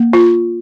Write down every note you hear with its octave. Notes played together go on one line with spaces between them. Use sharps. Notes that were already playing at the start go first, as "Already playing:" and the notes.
Already playing: A#3
F4